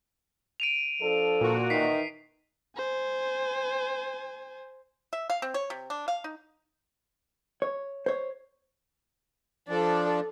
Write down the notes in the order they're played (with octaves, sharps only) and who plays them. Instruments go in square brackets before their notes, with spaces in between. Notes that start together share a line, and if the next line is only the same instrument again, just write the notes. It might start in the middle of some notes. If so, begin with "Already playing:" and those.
[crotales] D7 D#7 F7
[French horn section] F3 D4 A4
[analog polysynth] A#2 F#4
[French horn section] D#3 E3 D#4 [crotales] B6 C7
[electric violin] C5 G#5
[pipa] E5
F5
C4
C#5
C3
D4
F5
D#4
[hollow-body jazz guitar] C#5
C5 C#5
[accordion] F3 D4 [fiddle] A4 D5